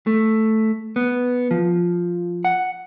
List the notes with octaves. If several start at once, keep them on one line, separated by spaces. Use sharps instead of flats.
A3
B3
F3
F#5